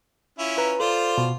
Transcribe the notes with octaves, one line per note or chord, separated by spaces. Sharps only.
C#4 E4 F4
B4 A#5
F4 A4 C5 D5
B2